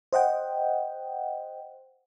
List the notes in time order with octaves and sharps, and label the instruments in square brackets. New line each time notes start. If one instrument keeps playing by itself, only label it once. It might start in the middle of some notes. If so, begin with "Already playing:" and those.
[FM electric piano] C5 D#5 F#5 G5